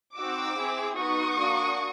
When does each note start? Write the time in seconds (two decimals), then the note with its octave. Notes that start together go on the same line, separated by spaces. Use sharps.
0.17 C4 D#4 F#4 D6 E6
0.58 C4 E4 G#4
0.98 B3 D#4 F#4 C#6 D#6
1.39 A#3 D4 F#4